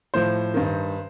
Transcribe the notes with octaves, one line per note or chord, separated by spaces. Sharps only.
A2 F3 C5
G2 D#3